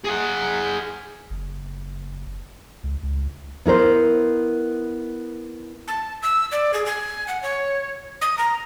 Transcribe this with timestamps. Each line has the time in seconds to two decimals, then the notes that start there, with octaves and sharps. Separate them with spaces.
0.04 G#4 F#5
1.30 F#1
2.84 C#2
3.03 C#2
3.66 B3 E4 A#4 C5
5.88 A5
6.22 E6
6.52 D5
6.74 G#4
6.86 G#5
7.28 F#5
7.43 C#5
8.21 D#6
8.38 A#5